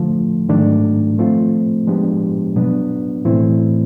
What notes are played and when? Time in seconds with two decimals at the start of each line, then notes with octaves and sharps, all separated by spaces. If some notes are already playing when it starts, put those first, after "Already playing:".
Already playing: D3 F3 A3
0.49 G#2 D#3 F#3 A3 D4
1.17 F3 A3 C4 F4
1.87 F3 G#3 B3 D4 G4
2.56 B2 F#3 B3 D4
3.25 A2 E3 A3 C4 E4